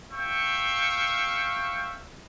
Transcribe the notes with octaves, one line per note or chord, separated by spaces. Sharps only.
E5 F5 G5 C#6